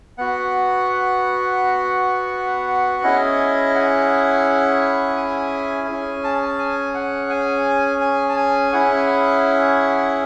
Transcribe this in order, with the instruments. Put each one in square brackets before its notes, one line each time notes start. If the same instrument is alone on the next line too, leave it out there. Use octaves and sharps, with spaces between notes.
[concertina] B3 F#4 F#5
C#4 E4 G#4 D#5
F#5
G#5
C#4 G#4 G#5
A5
A5
G#5
F#5
G#5
G#5
A5
G#5
C#4 E4 G#4 F#5